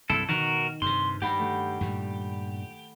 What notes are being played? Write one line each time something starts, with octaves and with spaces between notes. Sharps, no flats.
C2 G2 E4 A4
B2 D#3 F#4 A#4
G2 C3 C6
G2 G4 F#5 B5 A#6
A3
G2 A#2 G3